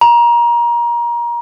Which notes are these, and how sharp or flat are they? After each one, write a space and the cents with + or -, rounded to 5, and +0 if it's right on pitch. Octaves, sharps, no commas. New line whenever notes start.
A#5 +25